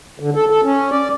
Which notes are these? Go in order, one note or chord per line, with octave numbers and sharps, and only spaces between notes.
D3
A4
A4
C#4
D5